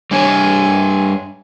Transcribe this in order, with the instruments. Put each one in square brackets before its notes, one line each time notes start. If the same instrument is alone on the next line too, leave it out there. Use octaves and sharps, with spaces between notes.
[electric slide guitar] G3 D4 C#5 [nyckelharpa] G#5